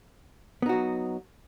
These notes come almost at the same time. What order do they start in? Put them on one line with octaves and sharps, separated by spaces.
B3 D#4 F#4 F#3